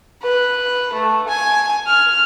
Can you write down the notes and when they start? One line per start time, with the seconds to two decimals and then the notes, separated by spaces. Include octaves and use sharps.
0.22 B4
0.93 A3
1.28 G#5
1.87 F6